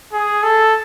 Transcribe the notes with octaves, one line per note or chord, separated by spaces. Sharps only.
G#4
A4